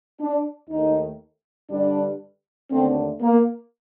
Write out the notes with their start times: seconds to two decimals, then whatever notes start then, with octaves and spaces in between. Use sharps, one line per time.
0.20 D4
0.70 D#2 D#3 A3 D#4
1.70 G2 D3 G3 D4
2.70 D#2 D3 A3 C4
3.21 A#3